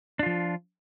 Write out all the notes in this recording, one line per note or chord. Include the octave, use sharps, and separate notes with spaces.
F3 D4 F4